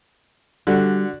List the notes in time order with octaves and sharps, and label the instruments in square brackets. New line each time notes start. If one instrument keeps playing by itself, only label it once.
[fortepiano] D3 F#4 [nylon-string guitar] G3